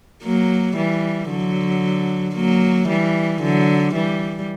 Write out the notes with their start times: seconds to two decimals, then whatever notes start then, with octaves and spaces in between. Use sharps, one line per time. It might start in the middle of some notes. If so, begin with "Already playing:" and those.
0.23 F#3 A#3
0.76 E3 G3
1.30 D3 F#3
2.35 F#3 A#3
2.88 E3 G3
3.42 D3 F#3
3.94 E3 G3